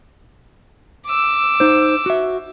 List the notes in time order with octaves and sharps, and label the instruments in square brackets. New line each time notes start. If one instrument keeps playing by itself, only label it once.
[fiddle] D6 E6
[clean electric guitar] D#4 C5
F#4 E5